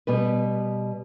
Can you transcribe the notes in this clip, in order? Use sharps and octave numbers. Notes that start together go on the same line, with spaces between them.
B2 G3 B4